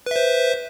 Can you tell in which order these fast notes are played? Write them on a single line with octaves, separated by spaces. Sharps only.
B4 E5 C5